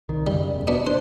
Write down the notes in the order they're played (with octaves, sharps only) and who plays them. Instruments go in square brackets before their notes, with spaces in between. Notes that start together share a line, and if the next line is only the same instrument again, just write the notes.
[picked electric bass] C2 D#3
[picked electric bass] F#2 C#3 [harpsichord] G3
[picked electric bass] E1
[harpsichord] B2 B3 D4
[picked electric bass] D4 [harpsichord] C5